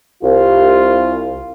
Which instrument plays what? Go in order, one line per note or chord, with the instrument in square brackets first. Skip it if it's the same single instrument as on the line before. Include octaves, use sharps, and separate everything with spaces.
[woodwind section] C2 [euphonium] F4